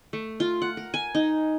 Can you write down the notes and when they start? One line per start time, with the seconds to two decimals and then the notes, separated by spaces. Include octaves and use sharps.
0.13 A3
0.40 F4
0.62 F#5
0.77 A#4
0.94 G#5
1.15 D#4